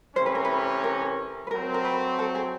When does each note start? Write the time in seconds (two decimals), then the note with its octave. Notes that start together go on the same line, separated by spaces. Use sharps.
0.16 C3 E3 A3 C#4 C5
0.26 B4
0.35 A#4
0.45 B4
0.84 A#4
1.47 B4
1.51 F#3 A3 C4 A#4
1.74 A#4
1.85 B4
2.19 A4
2.35 G#4